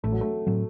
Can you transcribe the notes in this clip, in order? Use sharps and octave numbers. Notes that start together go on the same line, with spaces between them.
A1 A3
F#3
A3
A2 F#3 C4